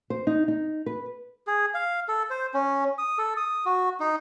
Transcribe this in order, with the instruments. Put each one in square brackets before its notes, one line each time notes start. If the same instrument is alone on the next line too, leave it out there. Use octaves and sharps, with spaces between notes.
[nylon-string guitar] C5
D#4
D#4
B4
[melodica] G#4
F5
A4
C5
C#4
D#6
A4
D#6
F#4
D#4